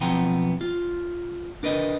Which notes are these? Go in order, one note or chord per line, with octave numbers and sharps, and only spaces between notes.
B1 F3 B3 C4 G5 A#5
F4
D4 A#4 B4 D#5